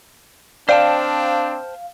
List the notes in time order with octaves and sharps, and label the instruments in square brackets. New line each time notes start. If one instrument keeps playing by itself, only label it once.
[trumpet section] C4 D4 [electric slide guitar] C5 G5 A5 [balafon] D5 [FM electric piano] F5